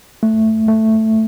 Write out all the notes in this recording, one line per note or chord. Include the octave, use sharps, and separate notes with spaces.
A3
A3